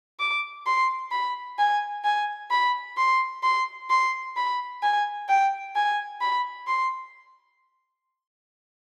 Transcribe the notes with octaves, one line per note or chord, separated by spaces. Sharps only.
D6
C6
B5
G#5
G#5
B5
C6
C6
C6
B5
G#5
G5
G#5
B5
C6